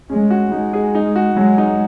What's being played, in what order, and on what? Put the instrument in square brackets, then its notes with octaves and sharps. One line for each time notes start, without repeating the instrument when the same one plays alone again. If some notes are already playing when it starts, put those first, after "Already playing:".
[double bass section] G#3 [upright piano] C#4
[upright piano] F#4
[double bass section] G#3 [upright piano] D#4
[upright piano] G#4
D#4
F#4
[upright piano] F#3 [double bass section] G#3
[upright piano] D#4